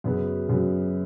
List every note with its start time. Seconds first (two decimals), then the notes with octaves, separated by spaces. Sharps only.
0.04 F#2 C#3 F#3 B3
0.49 F#2 C#3 F#3 B3